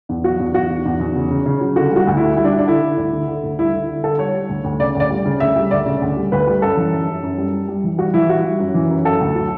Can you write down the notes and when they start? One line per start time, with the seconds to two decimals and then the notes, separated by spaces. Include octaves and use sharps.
0.09 E2
0.24 F#3 F#4
0.39 E2
0.54 E2 F#4
0.70 E2
0.85 E2
1.00 E2
1.16 C#3
1.31 C#3
1.46 C#3
1.61 F#3
1.76 D3 F#4
1.92 G3 F#4
2.07 D2
2.17 D3 E4
2.37 G3 E4
2.44 D4
2.52 G3
2.59 D4
2.67 D3 E4
2.82 D3
2.97 D2
3.13 D3
3.28 D3
3.43 D2
3.58 G3 E4
3.73 D3
3.89 D3
4.04 D3 A4
4.19 G3 C#5
4.34 G3
4.49 D2
4.64 D2
4.80 C#3 D5
4.95 D2
5.00 D5
5.10 G3
5.25 C#3
5.40 D2 E5
5.56 G3
5.71 D2 D5
5.86 C#3
6.01 D2
6.17 G3
6.32 D2 B4
6.47 G3
6.62 F#2 A4
6.77 E3
6.92 F#2
7.08 F#2
7.23 F#2
7.38 G3
7.53 G3
7.68 G3
7.84 E3
7.98 G3 F#4
8.14 E3 E4
8.29 G3 F#4
8.44 G3
8.59 F#2
8.74 E3
8.90 F#2
9.04 F#3 A4
9.20 D2
9.35 F#3